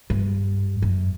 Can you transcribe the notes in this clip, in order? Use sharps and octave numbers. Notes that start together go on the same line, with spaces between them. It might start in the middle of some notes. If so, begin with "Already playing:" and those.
G2
F#2